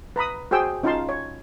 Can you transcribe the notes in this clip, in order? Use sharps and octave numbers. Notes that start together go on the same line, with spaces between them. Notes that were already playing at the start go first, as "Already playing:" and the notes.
B4 A#5 B5 D#6
F#4 G#4 C5 G5 E6
C#4 D#4 F4 F5 A5 C6
C#5